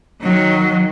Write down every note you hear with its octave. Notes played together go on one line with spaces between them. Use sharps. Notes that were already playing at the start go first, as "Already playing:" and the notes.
D#3 F#3